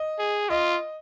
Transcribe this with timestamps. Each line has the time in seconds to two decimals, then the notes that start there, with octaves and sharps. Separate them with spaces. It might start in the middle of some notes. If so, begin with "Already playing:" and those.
Already playing: D#5
0.19 G#4
0.49 F4 D#5